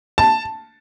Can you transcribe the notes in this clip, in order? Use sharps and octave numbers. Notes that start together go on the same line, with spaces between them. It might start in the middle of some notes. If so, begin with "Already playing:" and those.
A5